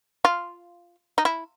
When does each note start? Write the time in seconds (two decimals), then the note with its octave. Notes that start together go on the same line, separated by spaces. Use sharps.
0.25 F4
1.18 D#4
1.25 E4